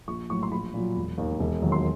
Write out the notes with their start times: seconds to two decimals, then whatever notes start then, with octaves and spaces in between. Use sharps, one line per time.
0.08 A#1 C#6
0.30 A2 F#3 C#6
0.43 C6
0.52 A#1 B5
0.74 A#2 F#3
0.96 E1
1.18 D#2 D#3
1.39 E1
1.62 D#2 D#3 F#3
1.72 C6